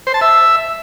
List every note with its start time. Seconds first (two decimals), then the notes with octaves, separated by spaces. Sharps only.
0.07 C5
0.14 A5
0.21 E5